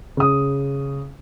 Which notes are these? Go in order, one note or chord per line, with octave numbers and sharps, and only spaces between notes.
C#3 D#6